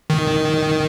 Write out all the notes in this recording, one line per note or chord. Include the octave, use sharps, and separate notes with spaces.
D#3